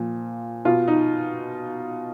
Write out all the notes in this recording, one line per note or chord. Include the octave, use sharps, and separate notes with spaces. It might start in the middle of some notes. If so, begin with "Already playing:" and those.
Already playing: A#2 F3
B2 F4
D#4